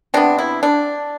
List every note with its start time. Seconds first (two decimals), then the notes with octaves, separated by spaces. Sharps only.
0.14 C3 F3 B3 D4
0.38 E4
0.63 D4